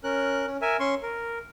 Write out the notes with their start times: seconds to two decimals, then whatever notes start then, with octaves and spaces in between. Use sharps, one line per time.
0.04 C#4 A#4 F#6
0.47 C#4
0.62 A#4 E5 G#5
0.80 C#4 C6 C#6
1.03 A#4